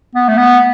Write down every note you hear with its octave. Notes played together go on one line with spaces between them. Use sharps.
B3
A3
B3